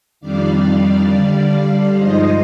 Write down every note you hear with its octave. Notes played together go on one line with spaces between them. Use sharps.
F2 D#3 G3 D4 D5 F5
D3 G3 D4
G2 F3 G#3 D#4 C5 D#5